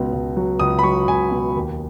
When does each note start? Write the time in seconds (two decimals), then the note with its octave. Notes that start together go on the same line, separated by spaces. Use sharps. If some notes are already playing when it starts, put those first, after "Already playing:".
Already playing: C#2 B2
0.13 C#2
0.37 F#3
0.60 C#2 D#6
0.79 B5
0.83 F#3 C#6
1.08 C#2 G#5
1.31 B2
1.56 D#2